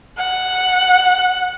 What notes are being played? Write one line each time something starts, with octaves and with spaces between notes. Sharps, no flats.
F#5